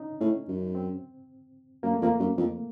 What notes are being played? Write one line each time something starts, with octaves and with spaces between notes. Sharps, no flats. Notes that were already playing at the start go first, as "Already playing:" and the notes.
Already playing: C#4 D#4
A2 C#4
F#2
C4
F#2 A#3
A3
F2 A#3
F#2
F2